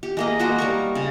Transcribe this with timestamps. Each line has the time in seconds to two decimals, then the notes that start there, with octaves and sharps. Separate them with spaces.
0.03 G4
0.17 G#3 A#3 D#5
0.39 A#3 F#4 C5 D#5
0.58 G3 A#4 C#6
0.95 C#3